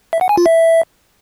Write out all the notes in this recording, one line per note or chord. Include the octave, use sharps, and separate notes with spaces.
E5
F#5
G#5
F4
E5